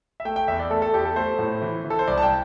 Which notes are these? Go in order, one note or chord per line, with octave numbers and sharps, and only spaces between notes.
E5
A3 G5
G5
E2 E5
D5
A3 A4
A4
E2 G4
A4
A3 C5
A2
E3
E3
A4
C5
C2 D5
A5
G5